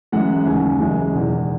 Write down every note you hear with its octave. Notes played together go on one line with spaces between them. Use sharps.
F#2 E3 G#3 F#5
D#2 C#3 G#3 G#5
F#1 F#2 E3 G#3
E1 E2 D#3